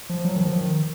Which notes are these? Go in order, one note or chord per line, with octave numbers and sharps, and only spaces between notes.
F3
F#3
D#3
F3
D#3